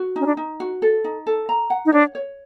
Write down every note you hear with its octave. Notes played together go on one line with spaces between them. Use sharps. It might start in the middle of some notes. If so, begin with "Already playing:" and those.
Already playing: F#4
C#4 D#4
D4
D#4
F#4
A4
D#4
A4
A#5
F#5
D#4
D4 C#5
C#5